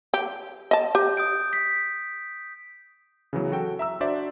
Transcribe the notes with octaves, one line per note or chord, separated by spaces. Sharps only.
G4
D#5 A5
G4 G6
D#6 G6 D7
B6
C#3 E3 F#3 B3
F#4 A4 G5
E5 A#5 E6
D4 F#4 C5 D5 E5